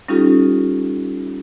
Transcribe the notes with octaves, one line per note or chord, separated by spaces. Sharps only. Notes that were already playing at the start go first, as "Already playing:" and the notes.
G3 C#4 D#4 F4 G4 A4